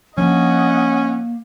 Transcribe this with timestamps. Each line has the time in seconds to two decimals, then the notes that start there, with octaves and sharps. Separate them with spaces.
0.18 F3 A#3 C#4 D4 D#5 F#5